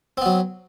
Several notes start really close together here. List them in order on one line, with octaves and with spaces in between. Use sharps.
C4 B3 F#3